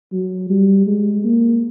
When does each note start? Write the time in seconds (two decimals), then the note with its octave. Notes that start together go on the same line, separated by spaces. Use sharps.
0.12 F#3
0.50 G3
0.87 G#3
1.24 A#3